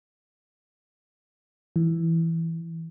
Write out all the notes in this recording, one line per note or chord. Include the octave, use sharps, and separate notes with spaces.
E3